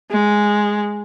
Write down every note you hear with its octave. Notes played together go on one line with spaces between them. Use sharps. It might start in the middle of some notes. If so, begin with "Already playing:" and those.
G#3